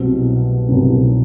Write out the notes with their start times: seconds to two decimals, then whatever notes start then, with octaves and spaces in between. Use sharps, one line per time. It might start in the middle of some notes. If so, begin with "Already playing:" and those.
Already playing: C2 B2 F#3 C4
0.68 C2 B2 F#3 C4